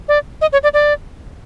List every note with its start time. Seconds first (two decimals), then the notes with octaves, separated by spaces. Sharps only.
0.08 D5
0.41 D#5
0.53 C#5
0.63 D5
0.74 D5